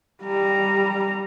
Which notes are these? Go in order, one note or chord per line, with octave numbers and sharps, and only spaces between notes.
G3 A#5